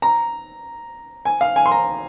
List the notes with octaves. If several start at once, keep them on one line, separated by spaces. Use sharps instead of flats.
A#5
G#5
F5
G#5
C6
A#5